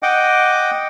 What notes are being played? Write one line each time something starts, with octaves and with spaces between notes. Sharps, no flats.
D#5 F#5 G5 D6